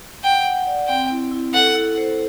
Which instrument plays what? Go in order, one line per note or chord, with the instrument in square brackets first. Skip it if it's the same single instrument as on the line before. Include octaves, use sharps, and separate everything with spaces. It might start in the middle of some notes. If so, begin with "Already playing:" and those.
[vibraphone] F#5 [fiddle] G5
[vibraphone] F#5
D5
[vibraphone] C4 [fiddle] G5
[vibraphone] E4
E4
[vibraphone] A4 [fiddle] F#5
[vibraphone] E4
C5